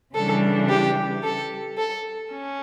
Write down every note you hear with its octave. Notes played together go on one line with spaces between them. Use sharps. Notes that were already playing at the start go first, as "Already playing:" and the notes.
C#3 E3 G3 D4 A4
G4
A4
A4
C#4